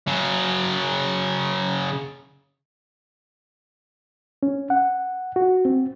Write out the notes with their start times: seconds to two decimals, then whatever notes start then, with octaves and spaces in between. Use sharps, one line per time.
0.07 C#3 F#3
4.43 C#4
4.70 F#5
5.36 F#4
5.65 C4